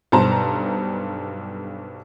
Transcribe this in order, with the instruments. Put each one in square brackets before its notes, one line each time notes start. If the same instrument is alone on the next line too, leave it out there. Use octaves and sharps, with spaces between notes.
[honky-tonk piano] B1 G2 C5 A5 A#5